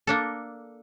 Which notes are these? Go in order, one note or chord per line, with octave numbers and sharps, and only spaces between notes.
A#3 D4 A4